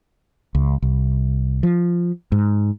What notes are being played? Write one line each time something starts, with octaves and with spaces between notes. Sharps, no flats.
C#2
C2
F3
G#2